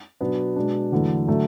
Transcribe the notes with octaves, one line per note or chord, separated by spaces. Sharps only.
B2 F#3 B3 D4
B2 G#3 D4
E2 D3 F#3 A3 E4
D3 F#3 A3